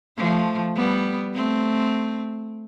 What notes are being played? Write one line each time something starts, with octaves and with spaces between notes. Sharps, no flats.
F3 A3
G3 B3
A3 C4